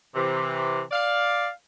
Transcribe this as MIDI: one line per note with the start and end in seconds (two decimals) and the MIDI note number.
0.15 0.81 48
0.15 0.81 52
0.91 1.48 74
0.91 1.48 77